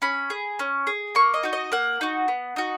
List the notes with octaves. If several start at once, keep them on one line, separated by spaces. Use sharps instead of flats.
C#4 B5
G#4
C#4
G#4
A#3 C#6
D#5
D#4 F#4
D#5
A#3 F#5
D#4 F#4
B3
D#4 F#4